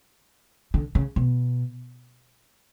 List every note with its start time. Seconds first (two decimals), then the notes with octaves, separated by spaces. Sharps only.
0.74 D3
0.95 C#3
1.16 B2